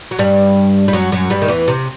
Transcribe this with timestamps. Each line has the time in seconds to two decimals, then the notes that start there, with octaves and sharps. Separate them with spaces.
0.11 F#3
0.19 G2 G3
0.88 G3
0.93 F#2 F#3
1.12 F#2 F#3
1.30 G2 G3
1.42 D#3
1.48 E2 E3
1.68 C3